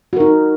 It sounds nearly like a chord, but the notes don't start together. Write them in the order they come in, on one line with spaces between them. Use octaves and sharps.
F#4 A#4 D#4